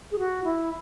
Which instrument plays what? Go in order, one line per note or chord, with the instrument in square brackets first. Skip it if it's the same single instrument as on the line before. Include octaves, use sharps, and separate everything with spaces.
[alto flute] G#4
F#4
E4